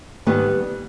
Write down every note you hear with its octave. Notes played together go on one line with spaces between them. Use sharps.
G#2 D#3 G3 B3